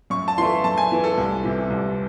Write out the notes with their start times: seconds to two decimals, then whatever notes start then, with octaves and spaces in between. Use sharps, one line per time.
0.10 F#2 C#6
0.28 A5
0.38 E3 A3 C6
0.64 F#2 A5
0.78 G#5
0.91 E3 A3
1.04 A4
1.17 C2
1.44 C3 E3
1.70 C2